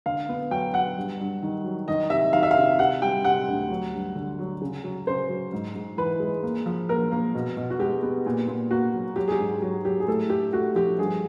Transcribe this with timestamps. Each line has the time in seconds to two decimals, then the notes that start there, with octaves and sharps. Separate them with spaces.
0.06 D3 F5
0.29 B3
0.51 F#3 G5
0.74 F#3 F#5
0.97 G2
1.20 G2
1.43 D#3
1.64 F#3
1.88 D#3 D#5
2.10 C3 E5
2.33 D#3 F5
2.43 E5
2.51 F5
2.56 C3
2.79 C3 F#5
3.02 G3 G5
3.24 C3 F#5
3.48 D2
3.70 F#3
3.93 G2
4.15 D3
4.39 F#3
4.61 C#3
4.84 F#3
5.07 C#3 C5
5.29 F#3
5.52 G#2
5.75 G#2
5.97 E3 B4
6.20 G#3
6.43 A#3
6.66 F3
6.89 A#3 A#4
7.11 A#3
7.35 B2
7.57 B2
7.70 F#4
7.79 G#3 G4
8.03 B3
8.26 A#2
8.48 A#2
8.71 A#3 F#4
8.94 F#3
9.16 F#3 G4
9.28 G#4
9.32 G4
9.39 G#2
9.62 F#3
9.84 F#3 G4
10.00 G#4
10.07 A2 A4
10.30 A3 G4
10.53 A3 F#4
10.75 F3 G4
10.98 G2 G#4